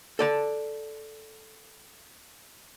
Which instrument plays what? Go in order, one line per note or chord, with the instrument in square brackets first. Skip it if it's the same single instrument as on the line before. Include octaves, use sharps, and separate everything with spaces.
[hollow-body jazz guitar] A4 D5 A5